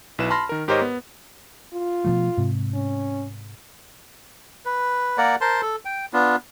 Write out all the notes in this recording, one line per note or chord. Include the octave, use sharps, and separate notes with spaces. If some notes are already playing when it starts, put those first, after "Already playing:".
B1 E4 B4 E7
A5 B5 C6 F6 A#6
D#3 A#4
G#2 G4 A#4 C5 C#5 D#5
B3
F4
B2 F3 A3
G#2 C3
C#4
B4
A#3 A#4 D5 F#5
A#4 C5 A5 C6
A4
G5
B3 D4 F4